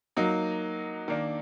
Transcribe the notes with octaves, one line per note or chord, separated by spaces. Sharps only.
F#3 A#3 D#4
D#3 A#3 D4